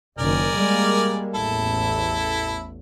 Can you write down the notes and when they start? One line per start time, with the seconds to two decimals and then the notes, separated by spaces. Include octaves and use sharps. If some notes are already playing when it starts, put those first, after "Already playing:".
0.18 F#1 D#3 A#4 D5 G#5
0.56 G3 G#3 A#3
1.35 A1 E2 E4 A4